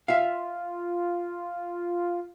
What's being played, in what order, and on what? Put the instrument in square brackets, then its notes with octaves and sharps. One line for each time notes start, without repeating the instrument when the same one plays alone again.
[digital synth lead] F4 [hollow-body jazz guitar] E5 F5